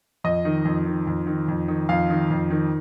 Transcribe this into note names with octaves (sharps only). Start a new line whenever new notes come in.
F2 D#5
D#3
F2
D#3
F2
D#3
F2
D#3
F2 F5
D#3
F2
D#3